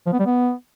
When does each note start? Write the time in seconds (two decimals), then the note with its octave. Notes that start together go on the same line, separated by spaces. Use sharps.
0.07 F3
0.13 B3
0.19 G3
0.26 B3